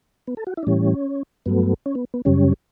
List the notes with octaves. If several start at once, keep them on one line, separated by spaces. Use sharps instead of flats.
B3
A4
F#4
E4
D4
A2 E3 G3 C#4
G2 F#3 A3 B3
C#4
B3
B3
F#2 C#3 G3 C#4